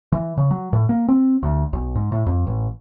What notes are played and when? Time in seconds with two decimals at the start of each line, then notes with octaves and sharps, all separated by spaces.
0.12 E3
0.37 C#3
0.51 F#3
0.73 A2
0.89 A#3
1.08 C4
1.43 D2
1.73 B1
1.95 G#2
2.12 A2
2.26 F2
2.47 A1